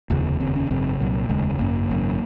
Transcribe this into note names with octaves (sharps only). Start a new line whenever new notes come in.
F1 D#2 C#3
F1 D#2 C#3 C4
C#4
G#1 F#2 C#3 C4
C2 A#2 F#3
F1 D#2 C#3 G#3
G#1 F#2 C#3 A#3
G#1 F#2 C#3